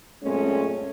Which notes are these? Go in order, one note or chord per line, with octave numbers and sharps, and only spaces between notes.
F#2 A#2 G#3 A3 C4 C#4